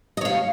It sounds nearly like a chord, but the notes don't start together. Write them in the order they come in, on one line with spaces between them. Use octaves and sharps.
D#5 C#5 F5